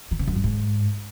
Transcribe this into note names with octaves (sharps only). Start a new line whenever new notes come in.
D#3
C#3
F#2
G2
G#2